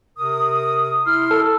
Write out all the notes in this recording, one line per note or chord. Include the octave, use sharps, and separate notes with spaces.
C3 A#4 D#6
E4 C6 F6
A4